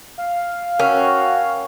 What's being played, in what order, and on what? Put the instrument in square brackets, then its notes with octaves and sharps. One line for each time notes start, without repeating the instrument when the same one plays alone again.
[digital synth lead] F5
[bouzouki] C#4 [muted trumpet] F#4 [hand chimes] A#4 G5